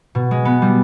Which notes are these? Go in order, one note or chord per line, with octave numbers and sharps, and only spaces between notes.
B2
G#3
B3
G3